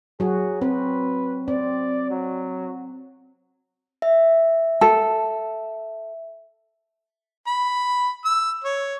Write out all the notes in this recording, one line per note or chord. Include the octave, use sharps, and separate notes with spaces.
F#3 F#4 G#4
C4 B4
C4 D5
F#3
E5
A4
B5
E6
C#5